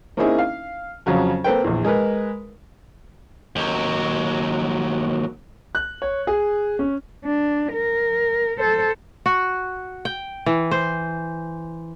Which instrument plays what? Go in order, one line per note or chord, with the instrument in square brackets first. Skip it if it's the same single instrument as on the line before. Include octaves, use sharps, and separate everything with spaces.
[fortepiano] A#3 C4 C#4 D#4 E4 G#4
F5
F2 C#3 F#3 C#4
A#3 C4 A4 B4 G5
A#1 E2
G#3 A#4 B4
[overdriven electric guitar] D#2 F#3
[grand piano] F#6
C#5
G#4
C#4
[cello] D4
A#4
A4 C5
[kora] F#4
G5
E3
C5